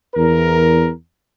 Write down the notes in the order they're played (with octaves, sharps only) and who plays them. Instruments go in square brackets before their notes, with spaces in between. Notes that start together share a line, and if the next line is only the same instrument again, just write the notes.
[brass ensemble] E2 A#4